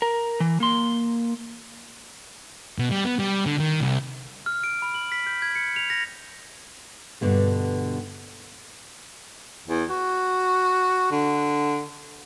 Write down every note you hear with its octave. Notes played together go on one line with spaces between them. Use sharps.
A#4
E3
A#3 C6
B2
G3
B3
G3
D3
D#3
C2
F6
D7
B5
F#7
B6
G6
G#6
C#7
F7
A#6
G2 B2 D3 A3
E2
F#4
D3